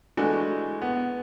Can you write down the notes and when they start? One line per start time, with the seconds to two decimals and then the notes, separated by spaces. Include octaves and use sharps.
0.17 E3 G#3 A3 D4 F#4
0.82 B3